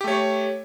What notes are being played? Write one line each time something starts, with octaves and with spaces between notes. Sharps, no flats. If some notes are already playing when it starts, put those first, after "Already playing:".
A3 G4 C#5